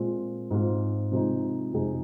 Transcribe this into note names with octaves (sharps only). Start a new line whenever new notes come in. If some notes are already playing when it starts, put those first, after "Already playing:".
Already playing: A#2 G#3 C4 F4
G#2 G#3 C4 F4
C3 F3 G#3 D#4
F2 C3 G#3 D#4 G#4